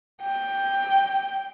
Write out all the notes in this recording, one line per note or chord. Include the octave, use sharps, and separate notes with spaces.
G5